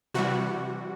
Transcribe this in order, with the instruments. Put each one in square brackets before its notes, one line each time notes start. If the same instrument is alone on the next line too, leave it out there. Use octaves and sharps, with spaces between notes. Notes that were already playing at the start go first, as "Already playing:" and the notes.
[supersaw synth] C3 E3 G3 F#4